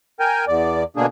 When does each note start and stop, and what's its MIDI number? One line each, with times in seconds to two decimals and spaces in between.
0.20 0.45 70
0.20 0.45 79
0.20 0.45 80
0.48 0.84 40
0.48 0.84 74
0.97 1.06 47
0.97 1.06 50
0.97 1.06 58
0.97 1.06 62
0.97 1.06 68